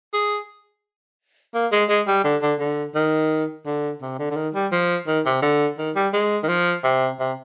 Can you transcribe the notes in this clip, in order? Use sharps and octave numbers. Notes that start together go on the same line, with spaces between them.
G#4
A#3
G#3
G#3
G3
D3
D3
D3
D#3
D3
C3
D3
D3
D#3
G3
F3
D#3
C3
D3
D#3
G3
G#3
D#3
F3
C3
C3